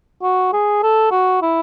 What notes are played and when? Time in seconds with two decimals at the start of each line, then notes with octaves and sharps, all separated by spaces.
0.23 F#4
0.53 G#4
0.83 A4
1.11 F#4
1.42 E4